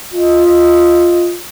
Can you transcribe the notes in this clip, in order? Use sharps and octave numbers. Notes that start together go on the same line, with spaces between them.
F4 D#5